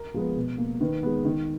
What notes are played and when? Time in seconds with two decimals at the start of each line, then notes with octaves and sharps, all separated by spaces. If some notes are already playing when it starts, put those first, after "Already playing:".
Already playing: A#4
0.14 F3 G#3 B3
0.36 B2
0.58 A#3
0.80 D#3 B4
1.03 G#3 B3
1.25 D#3